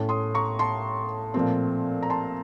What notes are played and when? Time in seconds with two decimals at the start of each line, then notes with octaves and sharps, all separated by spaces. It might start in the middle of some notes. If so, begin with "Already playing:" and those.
Already playing: A2 A3 C#4
0.09 C6 D#6
0.34 A#5 C#6
0.59 A5 C6
1.34 A#2 F3 A3 C4
2.03 A#5
2.10 A5 C6